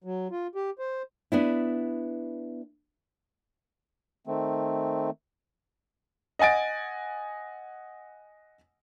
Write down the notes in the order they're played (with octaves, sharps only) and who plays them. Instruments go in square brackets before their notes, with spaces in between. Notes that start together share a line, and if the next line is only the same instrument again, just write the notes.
[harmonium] F#3
F4
G4
C5
[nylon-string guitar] B3 D4 E4
[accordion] D#3 A3 C4
[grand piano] D#5 F#5 G#5 A6 D7